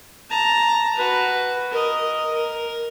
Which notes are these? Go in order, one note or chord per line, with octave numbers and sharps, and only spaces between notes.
A5 A#5
F#4 B4
A#4 D#5
A#4